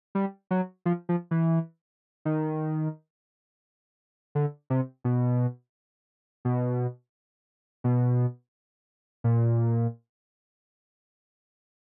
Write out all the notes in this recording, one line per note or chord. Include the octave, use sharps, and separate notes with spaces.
G3
F#3
F3
F3
E3
D#3
D3
C3
B2
B2
B2
A#2